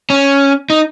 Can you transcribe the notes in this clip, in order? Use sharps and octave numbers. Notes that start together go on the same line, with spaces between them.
C#4
D#4